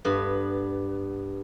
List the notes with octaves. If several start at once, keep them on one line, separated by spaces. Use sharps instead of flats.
G2 B3